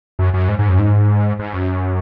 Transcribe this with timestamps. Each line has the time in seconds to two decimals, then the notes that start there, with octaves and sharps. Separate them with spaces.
0.19 F#2
0.34 F#2
0.48 G#2
0.59 G#2
0.69 F#2
0.79 G#2
1.39 G#2
1.53 F#2